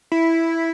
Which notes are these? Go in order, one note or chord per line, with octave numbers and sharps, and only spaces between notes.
E4